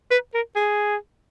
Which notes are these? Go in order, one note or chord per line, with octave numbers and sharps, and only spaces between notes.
B4
A#4
G#4